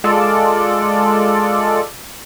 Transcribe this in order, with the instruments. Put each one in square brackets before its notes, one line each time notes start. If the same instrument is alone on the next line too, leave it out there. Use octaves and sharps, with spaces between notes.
[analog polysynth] G#3 F4 A4 D5